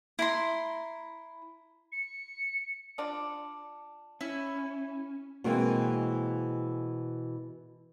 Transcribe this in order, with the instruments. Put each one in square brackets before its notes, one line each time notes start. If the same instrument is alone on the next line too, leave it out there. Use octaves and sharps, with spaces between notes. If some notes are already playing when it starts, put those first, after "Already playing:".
[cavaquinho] E4 A#5 C6
[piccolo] C#7
[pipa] F3 D4
[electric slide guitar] C#4 [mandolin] E4
[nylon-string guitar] B2 E3 G#3 A#3 C4